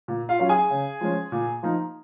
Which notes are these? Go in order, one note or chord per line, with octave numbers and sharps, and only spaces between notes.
A#2
F4 F5
F#3 C#4 F4
G#4 G#5
C#3
F3 G#3 C#4
A#2
F3 A#3 D#4